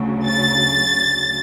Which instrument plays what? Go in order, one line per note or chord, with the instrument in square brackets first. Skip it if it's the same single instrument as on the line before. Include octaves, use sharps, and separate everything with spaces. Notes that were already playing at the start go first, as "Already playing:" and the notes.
Already playing: [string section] D2 C#3 F#3
[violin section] A6